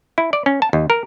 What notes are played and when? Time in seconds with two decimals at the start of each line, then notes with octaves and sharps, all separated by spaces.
0.18 E4
0.33 D5
0.46 C#4
0.62 A5
0.73 D#2
0.90 A#4